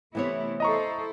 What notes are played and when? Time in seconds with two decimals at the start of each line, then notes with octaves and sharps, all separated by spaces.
0.15 C3 E3 A3 B3 E4 C#5
0.60 E4 A4 C5 D#5 A#5 C#6